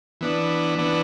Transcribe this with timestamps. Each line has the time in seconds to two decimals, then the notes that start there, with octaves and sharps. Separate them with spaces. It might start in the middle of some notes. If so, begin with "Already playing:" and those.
0.21 E3 B3 D4
0.78 E3 B3 D4